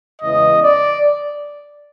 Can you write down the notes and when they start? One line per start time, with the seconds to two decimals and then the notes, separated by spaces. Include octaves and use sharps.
0.21 E2 C#3 E3 G#3 D#5
0.62 D5